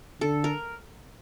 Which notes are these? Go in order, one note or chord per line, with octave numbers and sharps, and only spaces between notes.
D3 A4
A#4